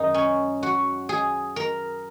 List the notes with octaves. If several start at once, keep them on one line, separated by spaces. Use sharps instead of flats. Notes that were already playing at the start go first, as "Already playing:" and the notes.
Already playing: F#2 D#3 G#3 D#4
C#4
F#4
G#4
A#4